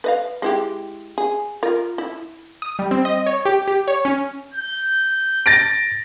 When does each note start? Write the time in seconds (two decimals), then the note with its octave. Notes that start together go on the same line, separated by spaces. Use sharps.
0.04 B4 D#5 F5
0.42 G#3 E4 G4
1.18 G#4
1.63 F4 A#4
1.98 E4
2.62 D#6
2.79 G3
2.91 C4
3.05 D#5
3.26 C#5
3.45 G4
3.68 G4
3.88 C#5
4.05 C#4
4.54 G6
5.46 A6 A#6 D7